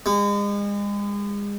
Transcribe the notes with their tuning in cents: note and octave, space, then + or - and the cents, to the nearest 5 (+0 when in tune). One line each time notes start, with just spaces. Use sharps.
G#3 -35